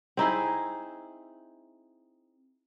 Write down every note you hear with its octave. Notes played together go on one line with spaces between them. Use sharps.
C4 D#4 E4 G#4